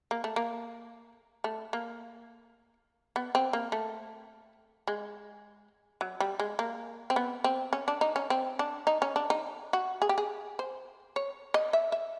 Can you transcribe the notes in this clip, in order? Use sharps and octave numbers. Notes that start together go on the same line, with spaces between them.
A#3
A3
A#3
A3
A#3
B3
C4
A#3
A3
G#3
F#3
G3
G#3
A#3
C4
B3
C4
C#4
D4
D#4
C#4
C4
D4
D#4
C#4
D4
D#4
F#4
G#4
G4
G#4
C5
C#5
D#5
E5
E5